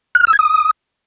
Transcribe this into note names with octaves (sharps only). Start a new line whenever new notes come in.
F#6
F6
E6
G#6
D#6